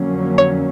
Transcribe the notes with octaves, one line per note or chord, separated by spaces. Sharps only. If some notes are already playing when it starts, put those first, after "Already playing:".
Already playing: F2 D3 F#3 A#3 C#4
C#5